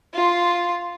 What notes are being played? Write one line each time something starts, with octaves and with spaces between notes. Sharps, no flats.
F4 C6